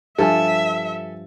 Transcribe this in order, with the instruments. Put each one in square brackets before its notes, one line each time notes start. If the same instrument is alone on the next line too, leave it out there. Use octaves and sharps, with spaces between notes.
[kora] G2 F3 [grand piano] A4 G#5 [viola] E5